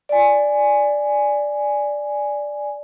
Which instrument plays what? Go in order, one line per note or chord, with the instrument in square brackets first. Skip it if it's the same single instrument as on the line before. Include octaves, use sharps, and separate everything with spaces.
[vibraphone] D5 G#5